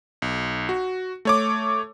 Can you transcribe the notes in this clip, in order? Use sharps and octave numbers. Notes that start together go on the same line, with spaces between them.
B1
F#4
A3 C#5 D6